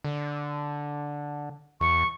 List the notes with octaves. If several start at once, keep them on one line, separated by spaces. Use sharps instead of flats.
D3
E2 C#6